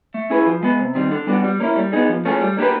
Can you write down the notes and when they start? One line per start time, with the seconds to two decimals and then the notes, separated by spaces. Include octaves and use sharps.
0.14 A3
0.30 C#4 E4 G#4 B4
0.46 F3
0.63 G#3 B3
0.79 C3
0.95 D#3 G3 C4
1.11 D3
1.27 G3 B3 D4 F#4
1.44 G3
1.60 A#3 C#4 E4
1.76 G3
1.93 B3 D#4 G#4
2.09 F3
2.25 A3 C#4 F4 G#4
2.41 G3
2.58 A#3 D4 G4 B4